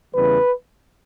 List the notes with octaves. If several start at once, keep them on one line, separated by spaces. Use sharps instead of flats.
E2 C#3 E3 G3 B4